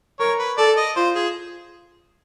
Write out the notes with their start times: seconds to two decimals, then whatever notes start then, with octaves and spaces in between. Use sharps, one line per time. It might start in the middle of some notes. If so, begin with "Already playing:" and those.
0.19 A#4 C#5
0.39 B4
0.58 A4 D5
0.77 D#5
0.96 F4 C5
1.15 G#4